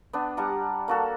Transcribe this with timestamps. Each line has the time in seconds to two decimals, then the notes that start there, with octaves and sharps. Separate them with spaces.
0.13 B3 D4
0.37 G3 F#5 A5 A#5
0.88 A#3 F#4 A4